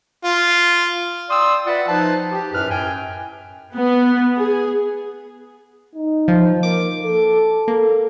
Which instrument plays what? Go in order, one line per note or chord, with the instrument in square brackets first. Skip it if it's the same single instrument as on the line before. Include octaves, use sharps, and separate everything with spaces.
[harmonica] F4
[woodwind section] D5 G5 C6 D#6 E6
F4 B4 D5 E5 F#5
F3 D#4 B4 C5 A5
G4
F#2 A2 B4 F6
F#2 G5 G#5
[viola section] B3
G#4
[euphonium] D#4
[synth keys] F3
[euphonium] A#3 [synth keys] D6
[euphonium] A4
[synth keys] A#3